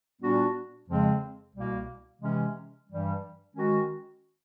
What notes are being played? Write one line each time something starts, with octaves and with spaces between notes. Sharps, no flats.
A#2 G3 B3 D4 F#4
F2 C#3 F3 G#3 C4
C2 B2 G3 A#3
C3 E3 G#3 C#4
G2 E3 G3
D#3 G#3 C#4 F#4